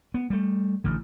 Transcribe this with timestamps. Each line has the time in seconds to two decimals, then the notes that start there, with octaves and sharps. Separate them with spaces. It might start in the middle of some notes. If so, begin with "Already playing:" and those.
0.14 B3
0.30 G3 A3
0.84 A1 D3